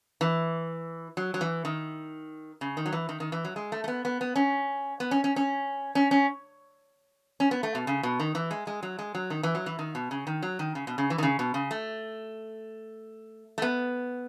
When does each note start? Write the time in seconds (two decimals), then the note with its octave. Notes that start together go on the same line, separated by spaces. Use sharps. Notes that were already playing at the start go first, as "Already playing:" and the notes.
0.21 E3
1.17 F#3
1.34 F#3
1.41 E3
1.65 D#3
2.61 C#3
2.77 D#3
2.86 F#3
2.92 E3
3.09 D#3
3.20 D#3
3.32 E3
3.45 F#3
3.56 G#3
3.72 A3
3.84 A3
3.88 B3
4.05 B3
4.21 B3
4.36 C#4
5.00 B3
5.11 C#4
5.24 C#4
5.36 C#4
5.95 C#4
6.11 C#4
7.40 C#4
7.51 B3
7.63 A3
7.75 B2
7.87 C#3
8.03 B2
8.20 D#3
8.35 E3
8.51 G#3
8.67 G#3
8.83 F#3
8.99 G#3
9.15 F#3
9.30 D#3
9.43 E3
9.55 F#3
9.66 E3
9.79 D#3
9.95 B2
10.11 C#3
10.27 D#3
10.43 F#3
10.59 D#3
10.75 C#3
10.87 B2
10.98 C#3
11.10 E3
11.18 D#3
11.23 C#3
11.39 B2
11.54 C#3
11.71 A3
13.58 A3
13.62 B3